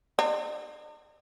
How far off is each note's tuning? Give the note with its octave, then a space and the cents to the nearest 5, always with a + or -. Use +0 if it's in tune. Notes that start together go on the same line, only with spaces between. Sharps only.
D4 +45